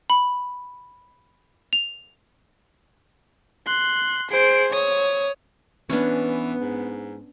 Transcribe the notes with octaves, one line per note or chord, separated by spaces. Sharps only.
B5
F7
C6 F#6
G#4 C5 D7
C#5 D#6
E3 B3 C#4 D4
G#2